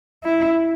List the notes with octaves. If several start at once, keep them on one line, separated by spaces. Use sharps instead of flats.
E4